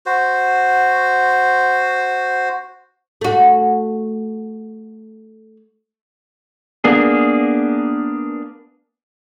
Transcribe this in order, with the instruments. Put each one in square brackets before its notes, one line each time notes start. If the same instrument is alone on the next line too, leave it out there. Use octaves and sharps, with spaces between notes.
[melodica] F#4 C5
[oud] A3 F#4
[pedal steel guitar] A#3 B3 D4 G#4